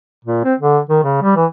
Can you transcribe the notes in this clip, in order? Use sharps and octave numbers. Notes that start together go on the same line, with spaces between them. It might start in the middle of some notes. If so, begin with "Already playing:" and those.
A#2
C4
D3
D#3
C#3
G3
E3